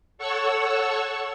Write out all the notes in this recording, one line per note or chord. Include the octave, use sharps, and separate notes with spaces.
A4 C#5 F#5 C#6 E6